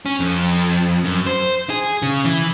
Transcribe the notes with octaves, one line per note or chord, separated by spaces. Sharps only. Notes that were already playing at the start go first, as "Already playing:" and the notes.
C#4
F2
F#2
C5
G#4
C#3
E3